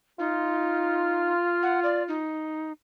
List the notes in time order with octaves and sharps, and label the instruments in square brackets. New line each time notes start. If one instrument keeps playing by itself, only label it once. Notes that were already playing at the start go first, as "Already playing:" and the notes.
[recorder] D#4 [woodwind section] F4
[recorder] F#5
D5
D#4